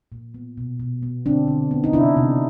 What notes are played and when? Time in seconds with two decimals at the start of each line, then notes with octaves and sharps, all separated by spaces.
0.12 A#2
0.34 B3
0.58 B2
0.80 B2
1.02 B3
1.26 D3 C4 D4
1.48 D3
1.71 B3
1.84 D#4
1.93 C3 D4 E4
2.17 C3